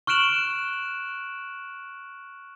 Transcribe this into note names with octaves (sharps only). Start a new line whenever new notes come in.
C#6 F6 F#6 D7 E7 F#7